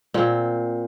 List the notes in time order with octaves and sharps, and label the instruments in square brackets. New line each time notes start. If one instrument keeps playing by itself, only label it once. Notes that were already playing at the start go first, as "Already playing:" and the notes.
[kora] A#2 C4